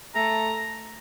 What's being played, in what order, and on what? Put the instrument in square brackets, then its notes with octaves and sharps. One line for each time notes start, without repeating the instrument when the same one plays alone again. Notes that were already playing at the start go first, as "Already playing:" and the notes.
[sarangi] A3 [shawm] A#5